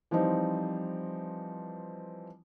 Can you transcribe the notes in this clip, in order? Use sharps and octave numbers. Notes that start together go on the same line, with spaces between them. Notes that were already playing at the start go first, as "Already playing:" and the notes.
E3 F3 G3 C4 D#4